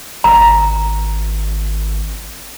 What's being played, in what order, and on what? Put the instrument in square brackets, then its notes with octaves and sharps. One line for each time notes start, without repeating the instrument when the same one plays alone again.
[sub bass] G#1 [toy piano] A#5